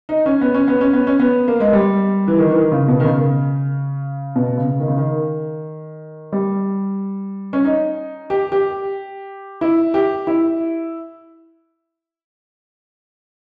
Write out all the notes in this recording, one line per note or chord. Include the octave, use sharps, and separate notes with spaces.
D#4
C#4
B3
C#4
B3
C#4
B3
C#4
B3
A#3
G#3
G3
E3
D#3
E3
D#3
C#3
B2
D#3
C#3
B2
C#3
D#3
C#3
D#3
G3
C#4
D#4
G4
G4
E4
G4
E4